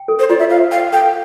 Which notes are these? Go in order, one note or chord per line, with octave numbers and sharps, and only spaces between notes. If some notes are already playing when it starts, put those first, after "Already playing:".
Already playing: G5
A4
C5
F4 D5
E5
C5 F5
F5 G5
A4 G5